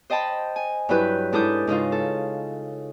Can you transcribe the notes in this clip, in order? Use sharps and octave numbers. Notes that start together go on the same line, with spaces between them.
C5 D#5 G5 A5 B5
G#5
G2 F#3 E4 B4 G6
G#2 D4 E4 A4 D#6 G6
G#2 C#3 D#4 F4
A4